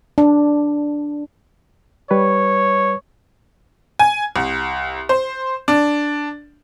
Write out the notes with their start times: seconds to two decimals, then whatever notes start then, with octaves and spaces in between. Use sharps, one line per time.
0.18 D4
2.11 G3 B4 C#5
3.99 G#5
4.36 C2
5.09 C5
5.68 D4